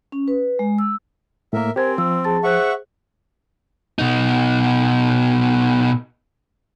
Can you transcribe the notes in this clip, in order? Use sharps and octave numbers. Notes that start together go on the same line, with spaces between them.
C#4
B4
G#3
E6
A2 A#3 A#4 E5
C4 G4 A#4 C5 G#5 G#6
F3 E6
G#4 A5 A6
G#4 C5 E5 F#5 C#6 F#6
B2 D#4